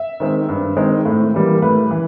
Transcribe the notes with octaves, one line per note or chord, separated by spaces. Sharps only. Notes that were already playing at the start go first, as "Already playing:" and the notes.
Already playing: E5
D#3 G#3 C4
G2
D#3 G#3 C4
A2
E3 G3 A#3
A2 B4
E3